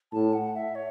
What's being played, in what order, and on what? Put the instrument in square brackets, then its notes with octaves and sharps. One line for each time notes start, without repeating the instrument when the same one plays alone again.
[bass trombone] A2 [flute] A5
[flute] F#5
E5
C#5